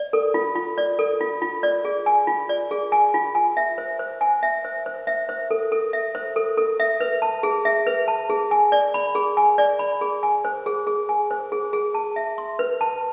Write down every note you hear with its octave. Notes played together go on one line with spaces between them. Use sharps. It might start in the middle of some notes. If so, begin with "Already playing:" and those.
Already playing: D5
A4
F4
F4
D5
A4
F4
F4
D5
G#4
G#5
F4
D5
G#4
G#5
F4
G#5
E5
C5
C5
G#5
E5
C5
C5
E5
C5
A4
A4
E5
C5
A4
A4
E5
B4
A5
G#4
E5
B4
A5
G#4
G#5
D5
B5
G#4
G#5
D5
B5
G#4
G#5
C5
G#4
G#4
G#5
C5
G#4
G#4
A5
E5
C6
B4
A5